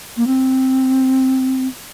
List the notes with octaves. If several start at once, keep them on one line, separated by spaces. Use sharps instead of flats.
A#3
C4